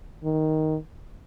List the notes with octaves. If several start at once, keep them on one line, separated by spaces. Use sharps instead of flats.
D#3